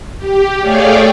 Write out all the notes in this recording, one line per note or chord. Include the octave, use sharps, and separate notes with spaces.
G4
A3 G#4 C#5 D5 F5 G5